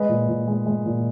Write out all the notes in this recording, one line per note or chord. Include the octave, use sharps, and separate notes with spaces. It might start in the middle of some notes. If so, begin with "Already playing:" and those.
Already playing: G#3 B4 D#5
A#2
A#2
G#3
G#3
A#2